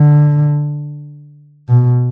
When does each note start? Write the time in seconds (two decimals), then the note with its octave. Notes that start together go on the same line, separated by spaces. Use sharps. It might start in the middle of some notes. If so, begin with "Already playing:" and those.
Already playing: D3
1.69 B2